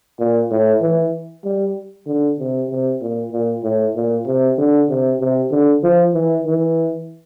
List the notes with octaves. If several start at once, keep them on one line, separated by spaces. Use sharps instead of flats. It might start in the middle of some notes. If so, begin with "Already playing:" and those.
A#2
A2
E3
G3
D3
C3
C3
A#2
A#2
A2
A#2
C3
D3
C3
C3
D3
F3
E3
E3